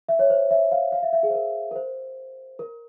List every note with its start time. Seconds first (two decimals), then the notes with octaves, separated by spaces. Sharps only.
0.09 E5
0.19 C#5
0.30 C5
0.51 E5
0.72 F5
0.92 F5
1.03 E5
1.13 E5
1.23 G#4
1.30 C5
1.35 A#4
1.71 A#4
1.76 C5
2.59 A#4